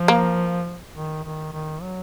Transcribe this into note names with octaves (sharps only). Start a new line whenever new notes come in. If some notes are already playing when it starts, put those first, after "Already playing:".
Already playing: F3
A#3
D#3
D#3
D#3
F#3